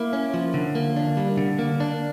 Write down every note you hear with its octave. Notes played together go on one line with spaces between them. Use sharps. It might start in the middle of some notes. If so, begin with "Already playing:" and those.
Already playing: A#3 E4
C#4
F3
D3
A#3
D4
G3
D3
A#3
D4